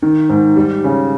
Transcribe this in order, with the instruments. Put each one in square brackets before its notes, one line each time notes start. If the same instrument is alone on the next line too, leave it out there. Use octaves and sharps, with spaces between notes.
[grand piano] D#3
G#2
G3
C#3